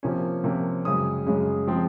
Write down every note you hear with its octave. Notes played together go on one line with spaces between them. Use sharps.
C3 F3 A#3 C#4
C3 F3 A#3 C#4
F#2 C#3 G#3 C#4 D#6
F#2 C#3 G#3 C#4
F3 G#3 C4